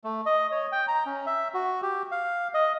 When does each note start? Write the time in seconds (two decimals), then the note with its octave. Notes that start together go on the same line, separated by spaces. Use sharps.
0.04 A3
0.26 D#5
0.52 C#5
0.72 G5
0.88 A#5
1.06 C#4
1.26 E5
1.54 F#4
1.82 G4
2.11 F5
2.54 D#5